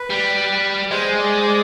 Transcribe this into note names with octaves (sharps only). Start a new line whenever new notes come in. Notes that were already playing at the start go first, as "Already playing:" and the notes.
Already playing: B4
G3
G#3 C5
D5
C5
D5